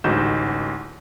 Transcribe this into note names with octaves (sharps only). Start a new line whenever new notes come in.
A1 D2 G#2 F#4 G6 E7